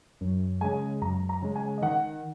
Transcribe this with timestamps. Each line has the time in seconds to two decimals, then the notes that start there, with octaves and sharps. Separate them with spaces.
0.21 F#2
0.61 C#3 G#3 G#5
1.02 F#2 A#5
1.29 A#5
1.42 C#3 G#3
1.56 G#5
1.78 D#5
1.82 D#3 F#5